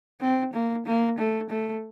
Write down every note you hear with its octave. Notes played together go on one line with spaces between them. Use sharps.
C4
A#3
A#3
A3
A3